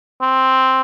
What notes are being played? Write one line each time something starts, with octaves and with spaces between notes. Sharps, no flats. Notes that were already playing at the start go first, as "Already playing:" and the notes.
C4